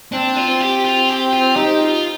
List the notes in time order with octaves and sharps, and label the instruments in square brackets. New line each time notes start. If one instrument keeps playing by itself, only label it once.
[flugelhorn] C4 [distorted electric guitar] D4
[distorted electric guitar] F4
[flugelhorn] C4
[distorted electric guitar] G4
F4
G4
F4
[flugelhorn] D#4 [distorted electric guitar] G4
[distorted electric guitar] F4